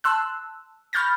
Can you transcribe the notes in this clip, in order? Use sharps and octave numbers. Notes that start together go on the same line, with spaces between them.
A5 C6 E6 F#6
B5 C#6 F6 G6 A6 A#6